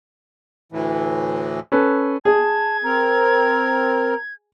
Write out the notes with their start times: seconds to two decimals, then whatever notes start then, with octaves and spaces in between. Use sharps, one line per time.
0.72 D2 A2 E3
1.72 C#4 A4 B4
2.25 G#4 A5 G#6
2.84 C4 A#4 A#5